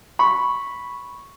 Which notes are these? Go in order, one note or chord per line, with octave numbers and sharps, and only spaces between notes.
B5 C#6